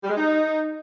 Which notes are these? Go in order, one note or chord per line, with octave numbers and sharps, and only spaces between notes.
G3
G#3
D#4